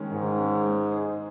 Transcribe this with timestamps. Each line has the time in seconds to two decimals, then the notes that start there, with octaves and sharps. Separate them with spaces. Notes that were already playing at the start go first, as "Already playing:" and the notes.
Already playing: D#3 G#3 C#4
0.12 G#2 D#3
0.39 G#3 C#4
0.65 G#3
0.91 D#4 G#4 C5